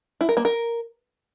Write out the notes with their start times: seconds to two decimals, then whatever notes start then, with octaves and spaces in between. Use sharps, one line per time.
0.21 E4
0.29 A#4
0.37 A#3
0.45 A#4